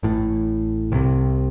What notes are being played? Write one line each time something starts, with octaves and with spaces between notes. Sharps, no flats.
A1 A2
C2 C3